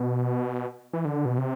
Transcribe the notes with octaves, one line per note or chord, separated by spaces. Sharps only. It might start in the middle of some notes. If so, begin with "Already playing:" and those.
Already playing: B2
E3
D3
B2
C3